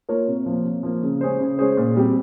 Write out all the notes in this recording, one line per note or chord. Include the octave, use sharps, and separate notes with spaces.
A#3 F4 A#4 C#5
C3
F3 A#3
C3
F3 A#3
C#3
G#3 C#4 G#4 C5
C#3
G#3 C#4 G#4 C5
A#2
G3 C4 G4